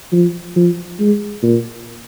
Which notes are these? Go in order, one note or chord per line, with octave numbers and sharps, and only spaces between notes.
F3
F3
G#3
A#2